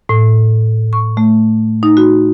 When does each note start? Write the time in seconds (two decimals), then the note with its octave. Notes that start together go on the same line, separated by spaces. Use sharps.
0.09 A2
0.93 C#6
1.17 A3
1.83 D#4
1.97 F#4